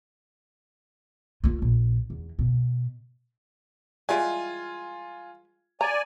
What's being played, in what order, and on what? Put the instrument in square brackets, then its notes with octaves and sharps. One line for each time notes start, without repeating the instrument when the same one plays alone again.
[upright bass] A#3 F4
A#1
E2
B2
[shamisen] E3 G3 G#3 [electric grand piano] F4 G#5
[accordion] D5 G#5 [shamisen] A#5